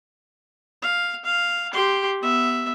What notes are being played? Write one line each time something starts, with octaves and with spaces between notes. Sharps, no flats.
F5
F5
G4 C6
B3 E5